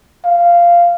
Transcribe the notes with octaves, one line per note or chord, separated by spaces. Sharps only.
F5